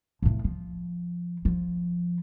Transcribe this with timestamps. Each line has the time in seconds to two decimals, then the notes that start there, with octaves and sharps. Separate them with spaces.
0.22 F2 A2
0.44 F3
1.45 F3